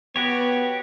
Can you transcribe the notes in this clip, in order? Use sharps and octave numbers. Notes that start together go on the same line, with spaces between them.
B3 F#4 G4 C#5